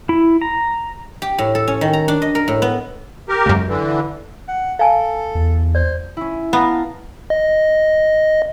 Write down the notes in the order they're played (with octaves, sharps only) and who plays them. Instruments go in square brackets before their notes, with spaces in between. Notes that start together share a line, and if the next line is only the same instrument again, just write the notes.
[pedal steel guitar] E4
A#5
[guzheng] G4
A2
A4
C#4
D#3
A#5
D4
D#5
A#4
A2
B3
[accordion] G4 A#4
[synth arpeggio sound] C#2 F#2
[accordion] D3 E3
[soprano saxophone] F#5
[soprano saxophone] A4 [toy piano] F5 G#5 A5
[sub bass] E2
[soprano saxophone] C5 [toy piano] D5
[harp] C#4 E4
[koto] B3 [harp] F5 A5 A#5
[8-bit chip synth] D#5